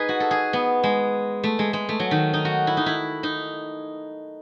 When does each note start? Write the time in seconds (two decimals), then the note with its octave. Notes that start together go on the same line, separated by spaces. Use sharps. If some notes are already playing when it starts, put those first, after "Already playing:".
Already playing: D#4 G#4 B4
0.09 F#4
0.20 A4
0.31 G#4
0.53 B3
0.83 G#3
1.44 A3
1.59 G#3
1.73 G#3
1.89 A3
2.00 F#3
2.11 D#3
2.33 D#4
2.45 F#4
2.67 E4
2.77 D#4
2.86 E4
3.23 D#4